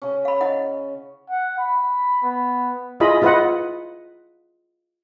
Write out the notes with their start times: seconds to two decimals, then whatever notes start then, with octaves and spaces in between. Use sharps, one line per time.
0.02 C#3 C#4
0.25 F5 B5
0.41 E4 D#5 F#5
1.30 F#5
1.59 B5
2.23 B3
3.00 E4 F4 G#4 D#5 B5
3.22 E4 F4 B4 D#5 F#5